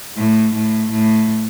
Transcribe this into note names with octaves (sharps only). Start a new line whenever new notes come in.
A2
A2
A2